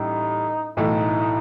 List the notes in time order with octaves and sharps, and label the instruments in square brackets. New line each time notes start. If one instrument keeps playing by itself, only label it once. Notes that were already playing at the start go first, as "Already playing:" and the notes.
Already playing: [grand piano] A1 A2 G3 [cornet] D#4
[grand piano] B1 A2 E3 A3 [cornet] D#4